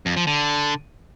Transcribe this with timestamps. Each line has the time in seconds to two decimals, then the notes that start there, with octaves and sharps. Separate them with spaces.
0.06 F2
0.16 F3
0.27 D3